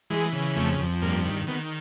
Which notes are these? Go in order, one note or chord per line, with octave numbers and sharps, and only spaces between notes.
E3 G#3
C#3
F2 A3
F2
G2 A#3
D#3
D#3 B3